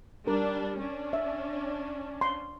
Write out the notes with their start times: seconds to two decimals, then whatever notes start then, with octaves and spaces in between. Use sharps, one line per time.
0.27 G3 D4 A#4
0.79 C#4 D4
1.13 E5
2.21 C6